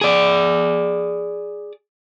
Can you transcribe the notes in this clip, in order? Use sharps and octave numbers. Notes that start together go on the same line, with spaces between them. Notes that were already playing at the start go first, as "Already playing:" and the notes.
G#4 D5